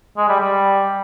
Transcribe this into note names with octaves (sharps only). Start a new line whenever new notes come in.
G#3
G3
G3